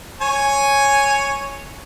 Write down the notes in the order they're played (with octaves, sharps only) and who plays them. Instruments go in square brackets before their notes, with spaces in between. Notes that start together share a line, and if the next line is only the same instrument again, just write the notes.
[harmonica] C#5 G#5